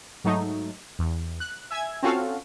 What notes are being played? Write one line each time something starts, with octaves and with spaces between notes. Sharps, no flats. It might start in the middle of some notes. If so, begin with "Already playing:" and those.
G#2 F#3 A3 D#4
E2
F#6
E5 G#5 E6 G#6
C4 C#4 F4 F#4 A4 F5